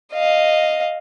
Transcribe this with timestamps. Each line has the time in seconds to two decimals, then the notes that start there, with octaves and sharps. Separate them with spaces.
0.14 D#5 F5